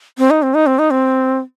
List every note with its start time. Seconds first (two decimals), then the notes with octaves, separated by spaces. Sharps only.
0.18 C4
0.30 D#4
0.43 C4
0.54 D#4
0.67 C4
0.79 D#4
0.91 C4